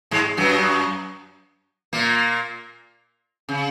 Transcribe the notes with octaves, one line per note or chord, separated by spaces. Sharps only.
G#2 G#3
F#2 F#3
A#2 A#3
C#3